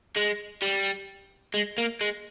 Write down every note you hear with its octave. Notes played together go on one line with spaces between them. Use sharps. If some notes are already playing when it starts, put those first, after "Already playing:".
G#3
G3
G#3
A#3
G#3